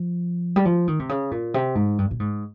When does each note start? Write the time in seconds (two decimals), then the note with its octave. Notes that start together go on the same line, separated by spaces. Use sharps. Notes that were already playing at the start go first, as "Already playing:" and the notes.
Already playing: F3
0.56 G3
0.65 F3
0.88 D#3
1.00 C3
1.09 C#3
1.31 A#2
1.54 C3
1.75 G#2
1.98 G2
2.11 A#2
2.20 G#2